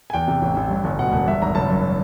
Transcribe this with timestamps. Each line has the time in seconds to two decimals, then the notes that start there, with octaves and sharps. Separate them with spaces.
0.10 G#5
0.13 E2 G5
0.28 C3
0.42 A1
0.56 A1
0.71 G2
0.84 G1
0.99 B2 F#5
1.12 E1
1.27 G2 E5
1.42 G#1 A#5
1.55 F#1 A5
1.69 F#2